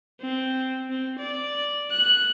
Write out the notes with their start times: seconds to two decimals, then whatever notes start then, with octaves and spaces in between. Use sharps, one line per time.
0.21 C4
0.90 C4
1.19 D5
1.91 F#6